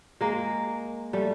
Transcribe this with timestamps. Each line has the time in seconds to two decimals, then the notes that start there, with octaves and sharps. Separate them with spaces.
0.21 G#3 A#3
1.13 G3 A3